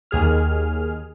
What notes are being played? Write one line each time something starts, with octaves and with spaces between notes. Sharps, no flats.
D#2 G#4 F6